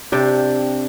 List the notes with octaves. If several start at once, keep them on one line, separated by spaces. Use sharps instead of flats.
C3 D4 G4